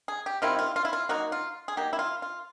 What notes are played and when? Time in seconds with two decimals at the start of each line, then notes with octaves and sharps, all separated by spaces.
0.08 G#4
0.26 G4
0.42 D#3 G3 C4 E4 F4
0.59 F4
0.76 F4
0.85 E4
0.93 F4
1.09 F#3 A#3 D#4 F#4
1.32 F4
1.68 G#4
1.77 F#3 A#3 D#4 G4
1.93 E4
1.99 F4
2.22 F4